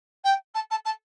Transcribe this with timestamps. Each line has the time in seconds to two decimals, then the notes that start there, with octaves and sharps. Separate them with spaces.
0.24 G5
0.54 A5
0.70 A5
0.85 A5